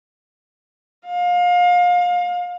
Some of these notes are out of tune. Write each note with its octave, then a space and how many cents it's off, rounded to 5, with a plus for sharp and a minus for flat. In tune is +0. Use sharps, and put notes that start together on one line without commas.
F5 +30